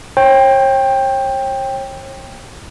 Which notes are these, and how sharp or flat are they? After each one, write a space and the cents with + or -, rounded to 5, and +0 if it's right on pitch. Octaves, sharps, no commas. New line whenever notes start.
C#5 -40 G5 +10